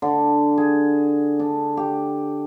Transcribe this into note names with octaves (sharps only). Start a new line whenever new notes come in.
D3
G#4
D4
G4